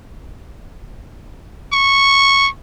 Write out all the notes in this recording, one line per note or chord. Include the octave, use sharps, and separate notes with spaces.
C#6